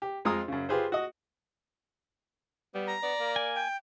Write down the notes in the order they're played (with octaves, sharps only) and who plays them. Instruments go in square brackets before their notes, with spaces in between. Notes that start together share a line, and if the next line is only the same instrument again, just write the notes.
[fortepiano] G4
F2 G#3 F4 G#4 A#5 D#6
F#2 C#3
F4 G4 G#4 B4 C5
F#4 D#5
[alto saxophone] G3 [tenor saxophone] B3
[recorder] A#5
[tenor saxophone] B3 [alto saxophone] D5
[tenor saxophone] A#3
[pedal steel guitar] G#5
[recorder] G5